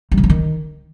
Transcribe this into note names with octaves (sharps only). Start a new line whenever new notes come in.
G2
C3
F#3
D#3